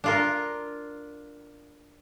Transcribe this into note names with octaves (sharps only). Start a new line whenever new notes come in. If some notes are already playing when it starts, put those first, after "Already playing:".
D4 F4 A#4